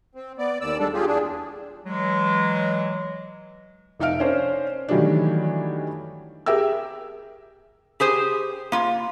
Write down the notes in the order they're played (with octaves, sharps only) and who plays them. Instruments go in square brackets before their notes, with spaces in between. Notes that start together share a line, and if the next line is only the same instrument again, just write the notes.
[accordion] C4
B3 D5
D#2 D5 E6
G3 G#3 D4 A4
F4 G4 G#4
E2 D4 G#4
[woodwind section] E3 F#3 G#3
[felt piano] F1 D#4 E5 F5 F6 D7
C#4 D4 A#4 C5
D#3 E3 F#3 G3 A3 D4
G4 G#4 A#4 E5 G5 E6
[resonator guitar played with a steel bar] G4 G#4 C5
A#3 F4